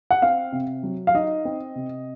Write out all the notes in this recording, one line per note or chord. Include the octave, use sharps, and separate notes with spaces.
F#5
C4 F5
C3
F#3
F5
D#4 D#5
C4
C3